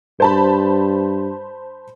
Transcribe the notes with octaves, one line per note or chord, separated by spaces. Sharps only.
G2 C5 A5 B5